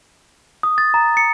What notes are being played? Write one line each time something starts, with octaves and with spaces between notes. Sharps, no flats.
D#6
A6
A#5
C#7